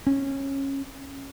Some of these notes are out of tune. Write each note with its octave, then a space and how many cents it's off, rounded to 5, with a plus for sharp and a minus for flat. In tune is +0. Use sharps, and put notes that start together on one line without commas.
C#4 -20